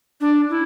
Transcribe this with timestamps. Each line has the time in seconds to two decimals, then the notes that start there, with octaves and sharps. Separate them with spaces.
0.20 D4
0.49 E4